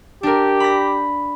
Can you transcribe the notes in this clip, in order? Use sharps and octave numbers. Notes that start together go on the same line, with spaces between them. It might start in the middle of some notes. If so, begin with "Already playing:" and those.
D4 G4 A#4
B5 A#6